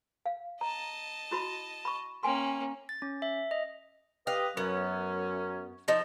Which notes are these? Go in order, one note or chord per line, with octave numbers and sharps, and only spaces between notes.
F5
D#5 A5 A#5
E4 F#4 B5
B5 C#6
A#3 C#4 G5 G#5 C6
A6
C#4
E5
D#5
G4 B4 D#5 F5
F#2 F#3 B3 C#4
F3 D#4 A4